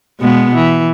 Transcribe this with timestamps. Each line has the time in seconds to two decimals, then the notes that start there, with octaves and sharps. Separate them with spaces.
0.20 B2 G#3 B3
0.55 E3